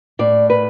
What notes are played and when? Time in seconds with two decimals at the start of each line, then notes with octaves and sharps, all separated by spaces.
0.19 A2 D5
0.50 B4